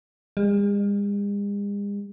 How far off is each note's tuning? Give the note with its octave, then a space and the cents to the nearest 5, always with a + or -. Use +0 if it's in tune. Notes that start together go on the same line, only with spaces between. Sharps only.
G#3 -45